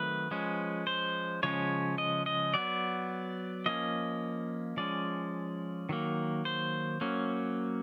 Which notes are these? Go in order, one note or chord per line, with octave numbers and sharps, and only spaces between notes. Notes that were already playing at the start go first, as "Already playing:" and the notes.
Already playing: D#3 F#3 A3 C4 B4
F3 G#3 C#4
C5
C#3 F3 G#3 C#4 C#5
D#5
D#5
F#3 B3 D5
F3 A#3 C#4 D#5
F3 G#3 C#4 D5
D#3 F#3 A#3
C5
F#3 A#3 C#4